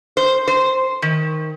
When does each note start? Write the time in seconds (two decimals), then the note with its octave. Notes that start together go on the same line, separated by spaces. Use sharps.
0.17 C5
0.47 C5
1.02 D#3